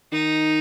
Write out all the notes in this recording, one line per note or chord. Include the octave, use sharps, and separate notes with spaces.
D#3 D#4